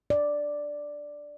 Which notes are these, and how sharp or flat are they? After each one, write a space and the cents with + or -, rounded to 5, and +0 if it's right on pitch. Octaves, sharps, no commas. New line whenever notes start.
D5 +0